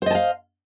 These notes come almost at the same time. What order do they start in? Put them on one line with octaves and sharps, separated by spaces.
C5 D#5 A5 F5